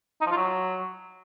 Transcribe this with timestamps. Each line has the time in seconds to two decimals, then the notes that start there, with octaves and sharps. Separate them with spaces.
0.21 D#4
0.26 F3
0.31 F4
0.37 F#3